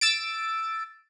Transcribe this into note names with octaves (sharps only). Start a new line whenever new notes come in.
E6 A6 D7